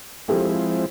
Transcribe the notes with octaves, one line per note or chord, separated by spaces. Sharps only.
F3 G#3 C4 E4 G4 A4